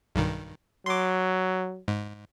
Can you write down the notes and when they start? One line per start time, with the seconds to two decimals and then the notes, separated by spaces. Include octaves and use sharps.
0.15 B1 G2 D#3
0.86 F#3 C6 D6
1.88 G#2